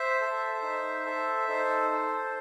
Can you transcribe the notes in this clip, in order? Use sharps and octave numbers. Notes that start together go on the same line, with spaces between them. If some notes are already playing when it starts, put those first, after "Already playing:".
Already playing: C5 E5
A4
D#4
A4
D#4 A4 C5
A4